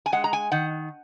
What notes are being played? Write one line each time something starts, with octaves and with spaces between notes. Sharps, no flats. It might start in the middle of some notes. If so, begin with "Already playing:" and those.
G#5
G#3 F#5
A#5
G#5
D#3 F#5